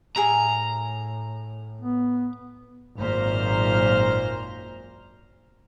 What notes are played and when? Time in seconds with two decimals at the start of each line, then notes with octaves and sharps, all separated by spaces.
0.16 A2 G#4 A#4 E5 A#5
1.81 B3
2.99 G#1 F#2 A#2 C5 A#5 F6